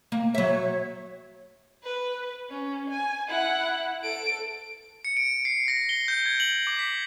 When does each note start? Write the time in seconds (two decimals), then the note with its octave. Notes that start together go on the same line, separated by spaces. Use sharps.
0.12 A#3
0.35 F#3 C#5 E5
1.83 B4
2.50 C#4
2.90 G#5
3.28 E4 F#5
4.03 A4 D7
5.05 C#7
5.17 D7
5.45 C7
5.68 A#6
5.89 G7
6.08 G6
6.26 G#6
6.40 F#7
6.67 D6
6.79 B6